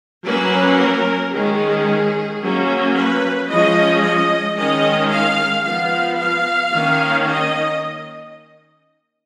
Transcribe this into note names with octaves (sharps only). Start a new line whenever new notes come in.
F#3 A#3 C#4 B4
A#4
D#3 G#3 C#4 G#4
F#3 A#3 C#4
B4
F3 G#3 C#4 D#5
D#5
D#3 G#3 C#4 D#5
F5
F3 B3 F5
F5
D#3 A#3 C#4
D#5